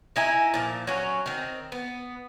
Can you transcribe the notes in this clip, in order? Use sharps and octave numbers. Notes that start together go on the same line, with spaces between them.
D#4 E4 G#5 A#5
A#2 F3
F#3 C#4
D#3 C4
B3